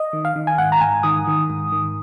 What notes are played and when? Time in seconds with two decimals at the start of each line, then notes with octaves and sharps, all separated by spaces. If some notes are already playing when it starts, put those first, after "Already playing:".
Already playing: D#5
0.13 D#3
0.25 F5
0.36 D#3
0.47 G#5
0.58 G#2 F#5
0.72 A#5
0.81 G#2 G#5
1.03 D#3 D#6
1.27 D#3
1.50 G#2
1.72 D#3